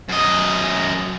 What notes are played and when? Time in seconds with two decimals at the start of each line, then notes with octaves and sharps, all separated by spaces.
0.09 F#2 D#5